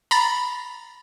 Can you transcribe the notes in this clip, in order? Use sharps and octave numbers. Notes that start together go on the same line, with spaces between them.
A#5 B5 A6